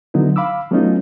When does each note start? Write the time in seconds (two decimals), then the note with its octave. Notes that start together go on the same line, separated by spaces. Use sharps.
0.14 D3 F#3 B3 D#4 E4
0.36 F5 B5 D6 E6
0.71 F#3 A3 B3 C#4 D#4 F4